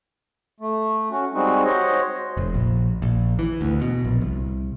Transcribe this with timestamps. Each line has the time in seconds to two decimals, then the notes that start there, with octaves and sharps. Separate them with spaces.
0.60 A3
1.11 C#4 F#4
1.34 G3 G#3 C4 D#4 F#4
1.65 F#4 C5 C#5 D#5
2.37 F1
2.54 A#1
3.02 A#1
3.39 E3
3.61 D2
3.81 B2
4.04 A#1
4.21 C2